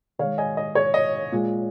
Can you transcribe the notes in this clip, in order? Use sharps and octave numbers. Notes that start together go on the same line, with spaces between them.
D#3 G#3 C#5 F5
D#5 G#5
D#5
C#5
D#5
A#2 G#3